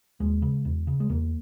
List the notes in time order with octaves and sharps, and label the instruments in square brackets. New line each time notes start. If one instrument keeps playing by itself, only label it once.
[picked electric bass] D#2 G#3
C#3
E2
C#3
G#3
E2 A#3